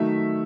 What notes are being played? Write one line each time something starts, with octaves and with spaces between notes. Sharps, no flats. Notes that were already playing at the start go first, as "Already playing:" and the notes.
Already playing: D#3 F#3 A3 E5